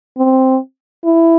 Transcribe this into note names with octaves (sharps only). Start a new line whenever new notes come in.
C4
E4